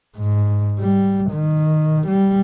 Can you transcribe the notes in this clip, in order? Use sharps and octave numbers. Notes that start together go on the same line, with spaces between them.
G#2
G3
D#3
G3